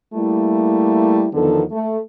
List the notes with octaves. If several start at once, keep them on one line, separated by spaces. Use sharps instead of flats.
G3 A3 A#3 E4
E2 D3 D#3 F3 B3 A4
A3